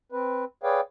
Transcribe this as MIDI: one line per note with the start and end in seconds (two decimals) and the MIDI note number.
0.12 0.45 60
0.12 0.45 71
0.63 0.81 68
0.63 0.81 71
0.63 0.81 73
0.63 0.81 74
0.63 0.81 77
0.63 0.81 79